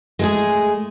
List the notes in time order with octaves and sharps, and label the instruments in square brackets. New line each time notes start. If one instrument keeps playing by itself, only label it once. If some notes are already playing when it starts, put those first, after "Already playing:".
[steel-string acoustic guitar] G#3 A3 G#4